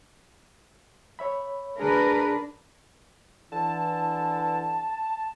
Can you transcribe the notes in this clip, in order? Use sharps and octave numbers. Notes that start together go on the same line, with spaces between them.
C#5 E5 B5
D2 D4 G#4 A#4 B4
D3 E3 A5